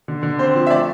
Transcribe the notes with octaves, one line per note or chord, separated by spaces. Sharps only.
D3
D3
C4 C5
F3
E5
A3 D5